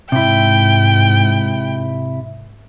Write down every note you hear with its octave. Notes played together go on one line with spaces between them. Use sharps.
G#2 C3 E4 G5